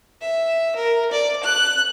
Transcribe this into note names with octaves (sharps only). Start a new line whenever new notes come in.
E5
A#4
D5
F#6